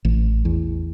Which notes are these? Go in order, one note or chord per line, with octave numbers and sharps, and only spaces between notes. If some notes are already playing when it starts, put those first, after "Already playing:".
A1
E2